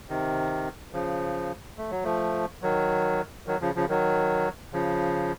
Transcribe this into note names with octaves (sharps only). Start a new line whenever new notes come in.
C3 D#3
C#3 F3
A3
F#3
F3 A3
D#3 F#3
D#3 F#3
C#3 F3
C#3 F3
D#3 F#3
C#3 F3